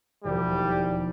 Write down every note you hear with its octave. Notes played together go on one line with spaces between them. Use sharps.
E1 D#2 F3 G3